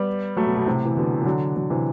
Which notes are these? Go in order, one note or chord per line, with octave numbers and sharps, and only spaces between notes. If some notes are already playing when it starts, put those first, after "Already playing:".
Already playing: G3 B3
F#3 A3
B2
B2
A2 C3
E3
B2 D3
E3
D3 F#3
D3 F#3
C3 E3